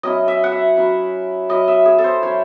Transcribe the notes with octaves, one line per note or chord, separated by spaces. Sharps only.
F#3 C#4 E4 D#5
E5
F#5
E5
F#3 C#4 E4
F#3 C#4 E4 D#5
E5
G#4
A4
C5
F#3 C#4 E4 C#5